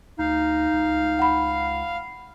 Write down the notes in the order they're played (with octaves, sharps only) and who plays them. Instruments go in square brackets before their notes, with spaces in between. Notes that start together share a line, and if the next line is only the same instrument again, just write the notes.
[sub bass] D2 [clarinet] D#4 [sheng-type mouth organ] F5
[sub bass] C#2
[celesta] F#5 B5